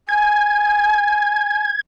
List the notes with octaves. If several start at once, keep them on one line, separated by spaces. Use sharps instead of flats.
G#5 G#6